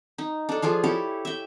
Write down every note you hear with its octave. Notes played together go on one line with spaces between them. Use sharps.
D#4
D4 A4
F3 F4 G#4 A4
E4 G4 A4 C#5
E5 G5